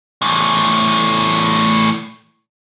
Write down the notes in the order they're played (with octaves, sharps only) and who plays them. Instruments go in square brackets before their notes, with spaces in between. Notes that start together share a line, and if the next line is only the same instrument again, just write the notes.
[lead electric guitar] E2 A2